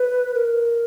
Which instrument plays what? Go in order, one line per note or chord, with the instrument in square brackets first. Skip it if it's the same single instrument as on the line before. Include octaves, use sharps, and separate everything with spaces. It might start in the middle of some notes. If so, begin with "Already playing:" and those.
Already playing: [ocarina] B4
A#4